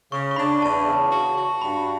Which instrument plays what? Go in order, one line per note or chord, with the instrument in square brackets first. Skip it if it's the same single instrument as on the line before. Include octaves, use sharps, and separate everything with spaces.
[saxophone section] C#3 [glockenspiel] C#6
[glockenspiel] C#6
[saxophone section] D4 [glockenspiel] B5
[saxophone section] E2 [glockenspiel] A5
[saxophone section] C#3
F#4
F#4
[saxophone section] G2 [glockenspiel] B5